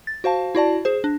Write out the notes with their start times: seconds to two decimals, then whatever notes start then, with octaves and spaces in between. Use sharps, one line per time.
0.07 A6
0.24 F#4 C5 F5 A5
0.55 E4 F#4 D5 A5
0.85 G#4 C5
1.04 D4